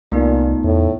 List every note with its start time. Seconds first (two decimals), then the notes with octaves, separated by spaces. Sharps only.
0.12 C2 A#2 A3 B3 D#4
0.64 E2 A2